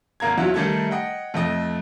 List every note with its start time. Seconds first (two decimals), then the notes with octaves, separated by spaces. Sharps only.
0.20 G#1 A#3 A#5 G#6
0.37 E2 F#3 E4 F4
0.54 D#3 G3 A3 A4 E5 G#6
0.91 D#5 F#5 G5
1.34 F2 A3 D#5